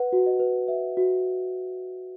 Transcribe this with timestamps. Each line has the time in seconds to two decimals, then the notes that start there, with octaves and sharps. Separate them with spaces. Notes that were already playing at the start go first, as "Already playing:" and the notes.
Already playing: B4 F#5
0.13 F#4
0.26 D#5
0.40 B4
0.68 B4 E5
0.97 F#4